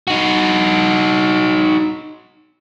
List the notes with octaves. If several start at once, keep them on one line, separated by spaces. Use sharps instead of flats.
D#4 F#4